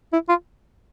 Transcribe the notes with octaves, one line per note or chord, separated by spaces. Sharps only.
E4
F4